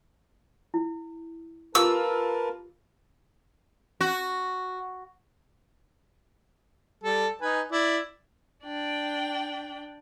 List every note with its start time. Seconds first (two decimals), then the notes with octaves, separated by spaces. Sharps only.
0.74 E4
1.75 F4 G4 A#4 B4 A5 D6 E6
4.01 F#4
7.04 G3 A4
7.42 D#4 B4 G#5
7.72 E4 D5
8.63 D4 D5 G5